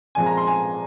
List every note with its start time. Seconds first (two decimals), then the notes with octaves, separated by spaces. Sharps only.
0.15 A#2 F3 G#3 C4 G#5
0.26 A#5
0.37 C6
0.47 G#5